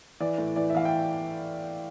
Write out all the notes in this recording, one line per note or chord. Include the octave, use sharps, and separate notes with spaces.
E3 D5
A2
E3 D5
E5
E3 F5
G5